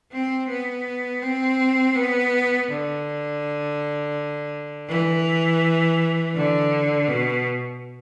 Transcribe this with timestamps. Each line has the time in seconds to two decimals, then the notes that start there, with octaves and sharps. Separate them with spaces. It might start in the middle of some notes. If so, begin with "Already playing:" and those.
0.12 C4
0.49 B3
1.22 C4
1.96 B3
2.69 D3
4.89 E3
6.36 D3
7.08 B2